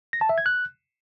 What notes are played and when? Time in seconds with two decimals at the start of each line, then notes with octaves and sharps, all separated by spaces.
0.13 A#6
0.21 A5
0.29 E5
0.38 G#6
0.46 F#6